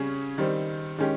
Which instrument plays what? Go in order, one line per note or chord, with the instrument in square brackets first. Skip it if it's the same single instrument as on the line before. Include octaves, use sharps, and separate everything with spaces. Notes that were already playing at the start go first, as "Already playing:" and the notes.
Already playing: [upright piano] C#3 G3 C#4 G#4 C#5
D#3 G3 C4
D#3 G#3 C#4 G4